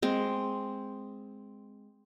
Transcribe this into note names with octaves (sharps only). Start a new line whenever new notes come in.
G#3 C4